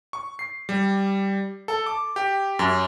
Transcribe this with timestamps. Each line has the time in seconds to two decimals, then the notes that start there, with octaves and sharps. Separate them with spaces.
0.13 C#6
0.39 C7
0.69 G3
1.68 A4
1.86 D6
2.16 G4
2.59 F#2